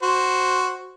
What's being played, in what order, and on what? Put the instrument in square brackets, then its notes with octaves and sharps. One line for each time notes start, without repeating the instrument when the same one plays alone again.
[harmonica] F#4 C5